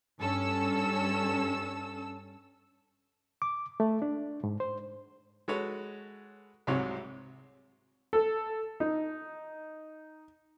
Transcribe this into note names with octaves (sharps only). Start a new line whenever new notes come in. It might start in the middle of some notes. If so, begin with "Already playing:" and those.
G2 C#4 A4 E6
D6
A3
D4
G#2
C5
G#3 F#4 A4 B4 C#5
C2 G#2 C3 F#3 G#3 C#5
A4
D#4